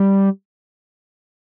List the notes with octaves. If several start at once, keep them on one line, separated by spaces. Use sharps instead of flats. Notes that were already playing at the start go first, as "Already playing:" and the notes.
Already playing: G3